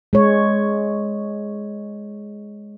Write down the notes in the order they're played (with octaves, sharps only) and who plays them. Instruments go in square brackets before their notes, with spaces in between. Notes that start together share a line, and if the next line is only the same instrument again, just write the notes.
[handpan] G#3 C#5